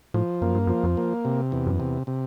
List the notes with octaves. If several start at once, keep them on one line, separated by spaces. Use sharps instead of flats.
A2 F3
F#2 A#3
G2
F#2 F3
F2
A#3
C3
E2
F#2
C3
C3